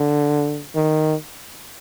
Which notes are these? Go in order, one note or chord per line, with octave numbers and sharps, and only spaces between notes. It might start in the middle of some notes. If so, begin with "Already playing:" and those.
Already playing: D3
D#3